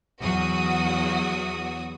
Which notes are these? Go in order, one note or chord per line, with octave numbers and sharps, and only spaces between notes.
E2 F#3 F#4 D#6